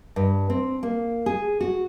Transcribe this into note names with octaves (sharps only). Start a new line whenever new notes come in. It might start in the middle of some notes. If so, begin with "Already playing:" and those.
G2
C4
A#3
G#4
F#4